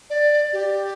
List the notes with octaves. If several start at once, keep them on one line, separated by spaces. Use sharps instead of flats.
D5
G4